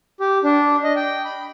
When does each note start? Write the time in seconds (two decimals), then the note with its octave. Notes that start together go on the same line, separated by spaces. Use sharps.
0.20 G4
0.43 D4
0.84 D#5
0.96 G5
1.25 B5